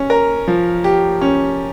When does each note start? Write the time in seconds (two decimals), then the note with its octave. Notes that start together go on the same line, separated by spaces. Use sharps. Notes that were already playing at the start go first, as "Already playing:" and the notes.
Already playing: C#4
0.10 A#4
0.48 F3
0.84 G4
1.21 C#4